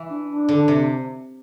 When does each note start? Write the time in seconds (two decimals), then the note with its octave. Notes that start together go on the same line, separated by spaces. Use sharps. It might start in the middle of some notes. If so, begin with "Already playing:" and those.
Already playing: E3
0.09 D4
0.29 D4
0.49 D3
0.68 C3